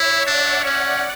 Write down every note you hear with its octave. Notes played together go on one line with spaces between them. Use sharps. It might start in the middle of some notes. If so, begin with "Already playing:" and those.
Already playing: E4 C#5 E5
D4 D5 F#5
C#4 D5 F#5